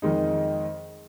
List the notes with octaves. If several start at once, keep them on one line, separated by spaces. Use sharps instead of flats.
F2 D#3 G#3 D#4